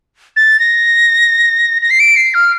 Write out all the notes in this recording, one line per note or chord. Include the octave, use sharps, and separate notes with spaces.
A6
A#6
A#6
C7
D7
C7
F6